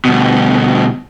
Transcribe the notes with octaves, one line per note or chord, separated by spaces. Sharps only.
D2 B2